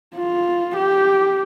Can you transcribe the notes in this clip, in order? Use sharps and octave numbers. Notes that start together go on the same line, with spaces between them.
F4
G4